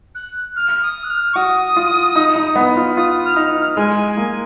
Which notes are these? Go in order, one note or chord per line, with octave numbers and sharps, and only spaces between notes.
F#6
F6
D#6
F#6
F6
C#6
F#4 D#6
F4
D#4
D#4
B3
F4
F4 D#6
F6
D#4
F6
G#3 G#5
G#5
A#3 G#5